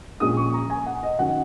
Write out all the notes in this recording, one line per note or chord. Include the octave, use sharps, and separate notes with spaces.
A#1 A#2 G#3 C#4 D#6
C#6
A#5
G#5
F#5
D#5
D#3 F#3 C#4 F#5